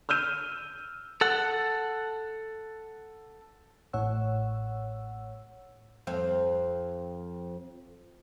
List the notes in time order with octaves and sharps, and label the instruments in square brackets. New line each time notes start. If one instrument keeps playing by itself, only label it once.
[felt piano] E6 F6 G6 D#7
[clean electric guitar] A4 F#5
[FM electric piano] A1 A2 C#5 F#5 E6
[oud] F2 C4